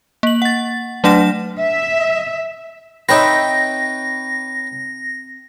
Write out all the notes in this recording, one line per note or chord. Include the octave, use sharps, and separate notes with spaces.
A#3 F#7
F#5 A6
F#3 A3 D4 F#5 A#6 E7
E5
C4 D#4 B4 C#5 E5 G5 A#6